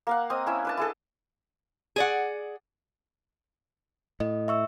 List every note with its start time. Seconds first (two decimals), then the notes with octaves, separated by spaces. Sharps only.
0.07 A#3 F5 F#5
0.30 C4 D#5 D#6
0.47 C#4 E4 E5
0.65 D4 B4 A5
0.78 E4 G#4 A4
1.96 G#4 D5 F#5
4.20 A2 D#5
4.48 E5 C#6 E6